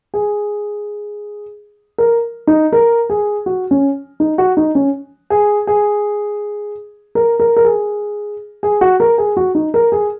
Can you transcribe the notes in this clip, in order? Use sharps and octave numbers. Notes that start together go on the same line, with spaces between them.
G#4
A#4
D#4
A#4
G#4
F#4
C#4
D#4
F#4
D#4
C#4
G#4
G#4
A#4
A#4
A#4
G#4
G#4
F#4
A#4
G#4
F#4
D#4
A#4
G#4